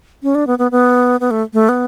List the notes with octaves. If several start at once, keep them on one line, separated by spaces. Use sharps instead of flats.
C#4
D4
B3
B3
B3
B3
A3
A3
B3